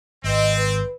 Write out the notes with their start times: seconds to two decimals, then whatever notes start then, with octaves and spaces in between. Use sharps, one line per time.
0.24 G#1 C4 B4 D#5
0.57 B4